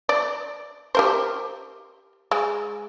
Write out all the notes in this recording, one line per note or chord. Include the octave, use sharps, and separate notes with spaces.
D5
G4 A#4 C5
G#3